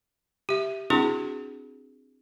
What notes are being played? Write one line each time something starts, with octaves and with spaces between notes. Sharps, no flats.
G4 E5
C4 D4 E4 F#4 G#4